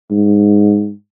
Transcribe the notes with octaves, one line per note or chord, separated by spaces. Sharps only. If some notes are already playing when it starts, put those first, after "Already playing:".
G#2